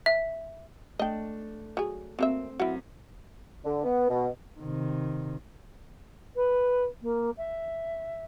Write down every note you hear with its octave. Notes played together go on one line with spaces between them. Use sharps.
E5
A3 D4 D#5 G5
F#3 G#4
F#3 A#3 C4 E5
F#2 E4 F#4
D3
B3
B2
C3 D#3
B4
A#3
E5